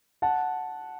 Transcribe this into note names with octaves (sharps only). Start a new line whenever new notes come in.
F#5 A5